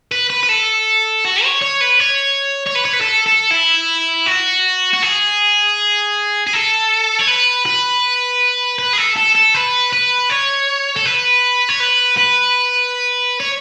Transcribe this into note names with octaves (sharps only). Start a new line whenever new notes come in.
B4
B4
B4
A4
F#4
C#5
C#5
B4
C#5
C#5
B4
C#5
B4
A4
A4
E4
F#4
F#4
G#4
G#4
A4
C#5
B4
B4
B4
G#4
A4
A4
A4
B4
B4
C#5
A4
B4
C#5
B4
B4
C#5